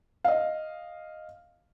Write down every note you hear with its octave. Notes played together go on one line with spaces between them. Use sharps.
D#5 F5